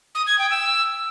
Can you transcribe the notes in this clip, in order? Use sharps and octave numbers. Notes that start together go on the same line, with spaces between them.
D#6
G#6
G5
E6